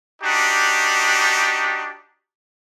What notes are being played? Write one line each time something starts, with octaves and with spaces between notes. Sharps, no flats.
D4 D#4 F#4 G4